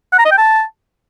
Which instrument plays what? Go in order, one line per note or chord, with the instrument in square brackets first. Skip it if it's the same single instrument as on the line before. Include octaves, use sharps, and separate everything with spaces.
[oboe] F#5
A#5
D#5
G5
A5